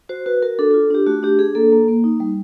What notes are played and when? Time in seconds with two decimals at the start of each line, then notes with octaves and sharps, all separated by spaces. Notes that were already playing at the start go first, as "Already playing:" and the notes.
0.09 F#4 C5
0.26 F#4 B4
0.42 F#4 A#4
0.59 D4 A4
0.71 A4
0.74 F4
0.91 D4 G4
1.06 A3 F#4
1.23 D4 G4
1.39 D4 G#4
1.55 A#3 A4
1.72 A#3
1.88 A#3
2.04 D#4
2.20 G3